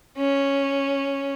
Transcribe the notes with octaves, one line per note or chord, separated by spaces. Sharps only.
C#4